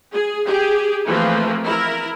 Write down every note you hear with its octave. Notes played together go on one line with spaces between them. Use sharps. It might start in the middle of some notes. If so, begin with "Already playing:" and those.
G#4
G4 G#4
E3 F3 A3 A#3 C4
E4 A#4